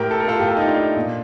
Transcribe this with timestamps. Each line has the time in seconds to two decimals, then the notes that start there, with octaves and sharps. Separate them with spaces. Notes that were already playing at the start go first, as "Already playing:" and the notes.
Already playing: A2 G4 A#4
0.11 A4
0.20 A#4
0.28 F4 A4
0.40 A2 G4
0.48 A4
0.57 D#4 G4
0.67 D4 F4
0.97 A#2